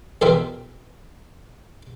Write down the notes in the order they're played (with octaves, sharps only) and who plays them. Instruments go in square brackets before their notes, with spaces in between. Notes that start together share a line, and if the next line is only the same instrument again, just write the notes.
[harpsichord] B1 E2 B2 C4 A#4 E5